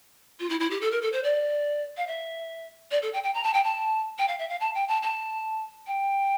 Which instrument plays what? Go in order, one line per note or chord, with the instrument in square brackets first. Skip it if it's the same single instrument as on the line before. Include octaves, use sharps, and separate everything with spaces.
[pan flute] F4
E4
E4
G4
A4
A#4
A4
C5
D5
F5
E5
D5
A4
G5
G5
A#5
A5
G5
A5
G5
F5
E5
F5
A5
G5
A5
A5
G5